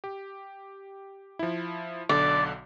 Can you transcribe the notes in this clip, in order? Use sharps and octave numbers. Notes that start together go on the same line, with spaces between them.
G4
F3 E4
B1 D3 D5